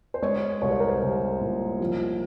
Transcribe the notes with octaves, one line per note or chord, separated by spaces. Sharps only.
C5
G#3 C#5
C2 C#5
C5
A#4
C5
C2
A#2
F3